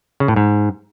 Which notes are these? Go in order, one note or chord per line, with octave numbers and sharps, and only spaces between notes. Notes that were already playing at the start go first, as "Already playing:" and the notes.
C#3
A2
G#2